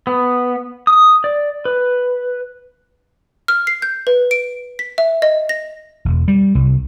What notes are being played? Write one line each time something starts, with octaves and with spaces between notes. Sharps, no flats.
B3
D#6
D5
B4
F6
C7
G6
B4
D7
B6
E5
D#5
A#6
E1
G3
C2